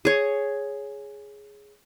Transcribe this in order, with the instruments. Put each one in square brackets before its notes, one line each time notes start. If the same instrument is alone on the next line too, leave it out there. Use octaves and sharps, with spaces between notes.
[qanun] G#4 C#5